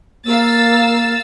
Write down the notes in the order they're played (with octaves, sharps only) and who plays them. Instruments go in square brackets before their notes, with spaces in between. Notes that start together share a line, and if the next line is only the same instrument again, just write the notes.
[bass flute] A#3 [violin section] F5 E6 A6